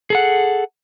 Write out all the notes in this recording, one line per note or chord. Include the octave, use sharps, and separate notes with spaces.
G#4 A4 F#5